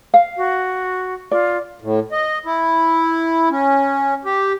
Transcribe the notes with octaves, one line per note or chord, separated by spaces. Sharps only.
F5
F#4
F4 D5
A2
D#5
E4
C#4
G4